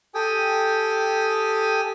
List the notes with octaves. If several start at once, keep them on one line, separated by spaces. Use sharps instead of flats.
G4 A4 G5 G#5 D#6